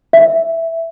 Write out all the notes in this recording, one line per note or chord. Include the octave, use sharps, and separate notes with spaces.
E5